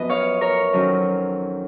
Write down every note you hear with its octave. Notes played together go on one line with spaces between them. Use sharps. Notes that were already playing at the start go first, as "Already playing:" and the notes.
Already playing: F#2 F3 B3 B4 D#5
C#5 F5
A#4 C#5
F2 D#3 F#3 C#4